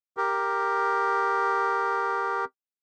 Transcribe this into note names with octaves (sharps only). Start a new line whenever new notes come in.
G4 A#4